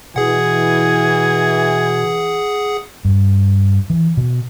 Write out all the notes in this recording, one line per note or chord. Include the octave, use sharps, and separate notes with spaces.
B2 E3 G#4 F#5 G#5
G2
E3
B2